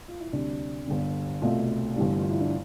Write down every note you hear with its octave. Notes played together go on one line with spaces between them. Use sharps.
F4
E4
D2 C3 G3 D4
G1 G2 D3
C2 B2 A3 F4
G1 G2 E3 G3
F4
E4
D4